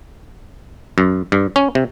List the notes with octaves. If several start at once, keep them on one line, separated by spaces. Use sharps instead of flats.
F#2
G2
C#4
C3